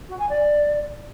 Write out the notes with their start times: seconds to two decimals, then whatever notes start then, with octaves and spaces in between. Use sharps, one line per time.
0.08 F#4
0.18 G#5
0.29 D5